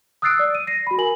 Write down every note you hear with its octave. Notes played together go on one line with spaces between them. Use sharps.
D#6 E6 F#6 A6 C7 D7
D5
D#7
A#6 C7 D#7
F#4 B5
A#4 G#5 F#7